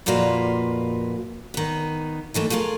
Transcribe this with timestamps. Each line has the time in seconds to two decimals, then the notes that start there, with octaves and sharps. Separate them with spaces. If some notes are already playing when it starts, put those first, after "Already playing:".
0.06 F2 A#2 A#3 F4 F#4 B4
1.54 D#3 B3
2.34 D#3 E3 A3 A#3
2.50 A3 E4 F4 G#4 A#4